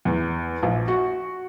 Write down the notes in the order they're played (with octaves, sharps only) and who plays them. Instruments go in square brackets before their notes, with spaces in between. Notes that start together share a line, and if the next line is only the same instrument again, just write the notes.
[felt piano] E2
A#1
F#4